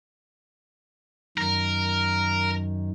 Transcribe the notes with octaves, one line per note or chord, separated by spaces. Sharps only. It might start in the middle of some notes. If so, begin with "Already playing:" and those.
F#2 D#3 A#4